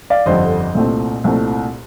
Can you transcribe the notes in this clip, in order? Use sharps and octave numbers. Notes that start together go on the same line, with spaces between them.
D5 F5
G1 F2 D3 G3 C5 D#5
C2 A#2 A3 C4
C2 A#2 A3 C4